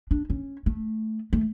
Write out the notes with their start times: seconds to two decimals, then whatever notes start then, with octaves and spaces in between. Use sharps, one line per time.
0.11 D4
0.30 C#4
0.66 A3
1.33 A3